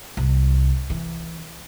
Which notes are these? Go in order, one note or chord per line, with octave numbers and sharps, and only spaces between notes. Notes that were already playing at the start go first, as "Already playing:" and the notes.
C2
E3